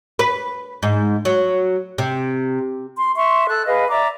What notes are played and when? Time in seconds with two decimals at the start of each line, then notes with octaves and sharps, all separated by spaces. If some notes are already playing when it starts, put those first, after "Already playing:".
0.19 B4
0.83 G#2
1.25 F#3
1.98 C3
2.98 C6
3.16 E5 C6 C#6
3.49 A4 E6 F#6
3.66 G#4 B4 D#5 F5
3.90 D5 E5 A#5 D6